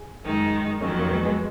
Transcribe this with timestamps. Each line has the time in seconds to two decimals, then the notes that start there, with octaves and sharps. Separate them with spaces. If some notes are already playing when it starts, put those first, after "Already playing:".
Already playing: G#4
0.23 F#2 D#3 G#3 D#4
0.81 F2 D#3 F#3 A#3 C#4
0.99 A#3
1.10 G#3 B3
1.25 G#3 B3